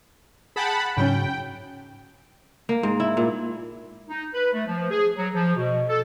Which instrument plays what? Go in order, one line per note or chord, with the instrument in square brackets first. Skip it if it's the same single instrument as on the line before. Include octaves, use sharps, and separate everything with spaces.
[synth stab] G#4 G5 [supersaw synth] F#5 A5 B5
[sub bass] G#2 [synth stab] C#3 F#3 C#4 [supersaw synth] G5
[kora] A#3
G#2
E4
A#2
[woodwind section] D#4
B4
A3
F3
G#4
F#3
F3
B2
A4